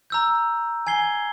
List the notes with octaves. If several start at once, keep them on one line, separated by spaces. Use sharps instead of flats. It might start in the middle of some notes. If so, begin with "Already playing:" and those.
A#5 E6 G6
G#5 G#6 C7 G7